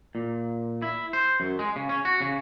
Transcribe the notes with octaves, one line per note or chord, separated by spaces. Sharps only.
A#2
E4
C5
F#2
G#3
C#3
C#4
F#4
C#3